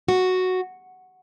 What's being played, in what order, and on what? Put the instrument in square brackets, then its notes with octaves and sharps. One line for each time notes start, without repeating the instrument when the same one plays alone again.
[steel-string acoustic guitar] F#4